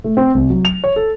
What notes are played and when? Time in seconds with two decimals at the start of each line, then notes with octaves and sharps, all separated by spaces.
0.04 A3
0.17 C4
0.35 C2
0.50 F#3
0.65 F7
0.84 C#5
0.96 A4